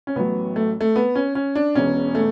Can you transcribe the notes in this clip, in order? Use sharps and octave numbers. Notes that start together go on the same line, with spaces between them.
C#4
A1 A2 F#3 B3
A3
A3
B3
C#4
C#4
D4
E1 E2 B2 C#4
A3